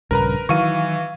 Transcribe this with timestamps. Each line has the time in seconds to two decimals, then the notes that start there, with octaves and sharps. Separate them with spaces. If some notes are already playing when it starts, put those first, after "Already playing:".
0.11 A#1 G2 C#3 A#4 B4 A#5
0.49 D#3 E3 F#3 F5 C#6 D#7